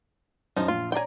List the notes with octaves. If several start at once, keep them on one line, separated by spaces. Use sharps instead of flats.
F#2 F3 D#4
A#1 F4
C#5 D5 G5 G#5 A#5